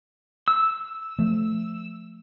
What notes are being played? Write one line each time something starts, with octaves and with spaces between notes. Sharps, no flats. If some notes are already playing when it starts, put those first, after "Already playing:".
E6
F3 A3